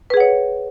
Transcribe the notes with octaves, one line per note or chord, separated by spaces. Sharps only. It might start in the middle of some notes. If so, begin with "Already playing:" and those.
G#4 B4 C#5 F#5